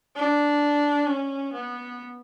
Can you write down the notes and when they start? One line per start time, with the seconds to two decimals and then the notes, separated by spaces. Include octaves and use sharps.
0.16 D4
1.07 C#4
1.53 B3